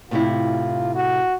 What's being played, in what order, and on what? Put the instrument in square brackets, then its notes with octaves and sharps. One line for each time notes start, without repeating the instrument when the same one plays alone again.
[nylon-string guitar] A2 C3 E4 [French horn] F4
[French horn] F#4